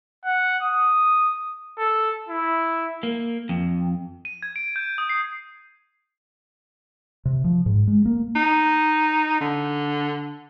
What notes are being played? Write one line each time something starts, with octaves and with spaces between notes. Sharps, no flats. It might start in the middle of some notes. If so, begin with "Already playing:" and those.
F#5
D#6
A4
E4
A#3
F2
D#7
G#6
D7
G6
D#6
C7
C3
F3
G#2
G#3
A#3
D#4
D3